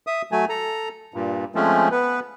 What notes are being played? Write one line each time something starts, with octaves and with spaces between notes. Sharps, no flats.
E5 D#6
F#3 A3 G#5
A4 A#5
G2 A#2
F3 G#3 A3 C4 C#4
B3 B4